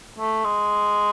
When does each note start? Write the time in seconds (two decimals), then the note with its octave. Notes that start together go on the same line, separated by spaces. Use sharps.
0.18 A3
0.45 G#3